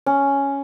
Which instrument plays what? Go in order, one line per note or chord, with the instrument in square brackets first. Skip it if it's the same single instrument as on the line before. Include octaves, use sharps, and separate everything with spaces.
[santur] C#4